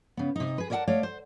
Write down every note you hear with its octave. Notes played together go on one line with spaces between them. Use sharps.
C#3 B3
C3 D#4
G#4 B4
A#4 C#5 D5 E5 F#5 A5
A3 C#5 D5 F5
C5